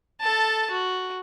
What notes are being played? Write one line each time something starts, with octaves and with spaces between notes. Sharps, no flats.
A4 A5
F#4